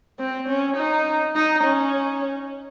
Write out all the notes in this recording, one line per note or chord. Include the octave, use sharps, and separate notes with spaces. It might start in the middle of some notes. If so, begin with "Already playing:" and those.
C4
C#4
D#4
D#4
C#4